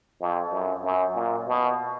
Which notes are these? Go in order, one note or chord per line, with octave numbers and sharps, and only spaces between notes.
F2
F#2
F#2
A#2
B2